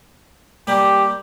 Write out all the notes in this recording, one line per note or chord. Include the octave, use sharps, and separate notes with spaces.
G3 A#3 G4